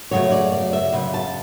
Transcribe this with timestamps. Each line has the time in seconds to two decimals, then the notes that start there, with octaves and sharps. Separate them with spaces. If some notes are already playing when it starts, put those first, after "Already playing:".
0.11 F#2 C#3 F#3 A3 C#5
0.32 D5
0.52 D5
0.73 E5
0.93 F#2 C#3
1.14 A5